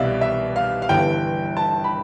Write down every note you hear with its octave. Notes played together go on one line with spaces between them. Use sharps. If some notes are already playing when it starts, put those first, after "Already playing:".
Already playing: C2 B2 G3 D5 E5 F5
E5
F5
F5
G1 G2 E3 G5
A5
B5